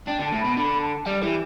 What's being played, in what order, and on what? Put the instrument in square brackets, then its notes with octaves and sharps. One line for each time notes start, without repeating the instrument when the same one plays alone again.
[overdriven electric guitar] D4 [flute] G5
[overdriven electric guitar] D3
[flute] A5
[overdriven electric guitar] A2
[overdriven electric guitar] B2 [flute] B5
[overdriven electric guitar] D3 [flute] B5
[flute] A5
[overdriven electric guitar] G3 [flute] D5
[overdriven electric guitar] E3 [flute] G4